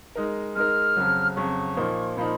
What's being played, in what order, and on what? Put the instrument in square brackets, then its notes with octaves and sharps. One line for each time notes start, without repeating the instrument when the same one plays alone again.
[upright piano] G#3 D#4 A#4
[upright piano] G#3 D#4 A#4 [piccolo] F6
[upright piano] F2 C#3 F#3
[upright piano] F2 C#3 F#3 [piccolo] C#6
[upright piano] A#2 F3 A#3 D#4
[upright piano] A#2 F3 A#3 D#4 [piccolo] B5